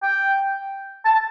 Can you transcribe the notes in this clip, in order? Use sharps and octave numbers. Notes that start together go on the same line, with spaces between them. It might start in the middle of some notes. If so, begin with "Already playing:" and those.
G5
A5